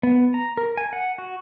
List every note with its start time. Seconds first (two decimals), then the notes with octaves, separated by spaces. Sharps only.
0.03 B3
0.34 A#5
0.57 A#4
0.77 G#5
0.93 F#5
1.18 F#4